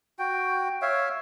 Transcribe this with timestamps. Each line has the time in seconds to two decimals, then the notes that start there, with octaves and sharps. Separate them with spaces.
0.19 F#4 G5
0.82 C#5 E5 F5